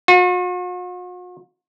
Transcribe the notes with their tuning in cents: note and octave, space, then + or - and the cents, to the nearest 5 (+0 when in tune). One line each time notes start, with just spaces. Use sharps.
F#4 -45